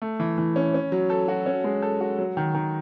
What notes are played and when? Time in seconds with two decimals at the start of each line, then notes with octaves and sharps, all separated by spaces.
0.02 A3
0.20 E3
0.38 E3
0.56 C#4
0.74 C#4
0.92 F#3
1.10 A4
1.28 F#4
1.46 C#4
1.64 G#3
1.82 A4
2.01 F#4
2.19 F#3
2.37 D#3
2.54 D#3